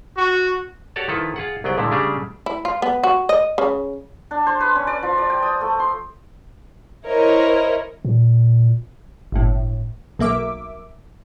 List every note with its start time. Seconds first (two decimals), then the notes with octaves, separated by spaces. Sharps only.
0.17 F#4
0.96 F#4 G4 A4 C#5 D5 A5
1.08 D#3 F3 E4 F4 A4 B4
1.36 F4 G#4 F#5
1.64 C2 F#3 B3 G#4 G5
1.78 A#2 D3 G#3 A3 E4
1.91 C#3 G3 A3 D4 G4 G#4
2.46 E4
2.65 F4
2.82 B3
3.03 F#4
3.29 D#5
3.58 C#3
4.31 D4
4.47 C5
4.60 B4
4.75 C#4
4.87 D5
5.03 F3
5.18 D5
5.30 G5
5.43 D#6
5.61 A3
5.80 C6
7.07 E4 A#4 C5 C#5 D#5
8.05 A#2
9.32 G1 A2
10.19 B1 A#3 E5 D6